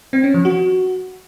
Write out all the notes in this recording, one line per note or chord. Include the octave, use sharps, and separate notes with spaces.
C4
C#4
F3
F#4